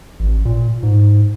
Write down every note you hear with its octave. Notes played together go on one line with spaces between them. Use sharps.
A1
A#2
G#2